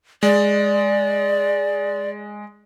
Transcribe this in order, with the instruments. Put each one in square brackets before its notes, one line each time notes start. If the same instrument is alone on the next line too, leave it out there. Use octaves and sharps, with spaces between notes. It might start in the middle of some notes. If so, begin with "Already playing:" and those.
[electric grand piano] G#3 [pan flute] D5